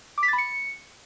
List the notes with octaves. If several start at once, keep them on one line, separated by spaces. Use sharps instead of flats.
D6
B6
A6
B5
C#7